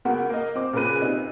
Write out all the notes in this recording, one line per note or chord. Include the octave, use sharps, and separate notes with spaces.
C#2 A#3 B3 F#4 A#4
A#3 A#4 D#5
C4 D6
A#2 C#3 A#4 B4 D#7
C3 D#4